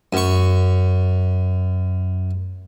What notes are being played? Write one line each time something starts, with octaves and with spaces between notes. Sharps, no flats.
F#2 C#6